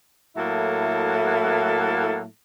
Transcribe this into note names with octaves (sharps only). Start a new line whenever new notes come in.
A2 F#3 A#3 E4 A4